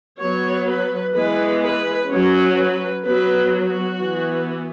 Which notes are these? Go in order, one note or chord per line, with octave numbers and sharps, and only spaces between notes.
F#3 B3 C#5
B4
E3 G#3 B3 B4
B4
F#3 C#4 C#5
B4
F#3 B3 B4
F#4
E3 B3